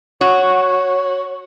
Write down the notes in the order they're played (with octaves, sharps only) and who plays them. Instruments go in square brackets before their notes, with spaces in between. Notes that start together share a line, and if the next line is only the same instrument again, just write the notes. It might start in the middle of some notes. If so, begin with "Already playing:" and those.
[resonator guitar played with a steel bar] F#4 [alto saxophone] C#5